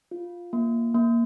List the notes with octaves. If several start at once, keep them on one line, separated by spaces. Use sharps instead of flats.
F4
A#3
A#3